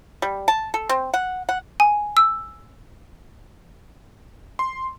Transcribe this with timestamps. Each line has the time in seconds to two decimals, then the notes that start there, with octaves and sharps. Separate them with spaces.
0.22 G3
0.48 A5
0.74 A4
0.89 C4
1.14 F#5
1.49 F#5
1.80 G#5
2.17 E6
4.59 C6